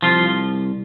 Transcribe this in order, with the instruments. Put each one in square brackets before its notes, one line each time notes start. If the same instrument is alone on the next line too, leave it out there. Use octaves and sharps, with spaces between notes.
[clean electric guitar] C2 F3 F4